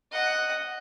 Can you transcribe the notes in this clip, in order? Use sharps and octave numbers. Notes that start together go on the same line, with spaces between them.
D#5 F#5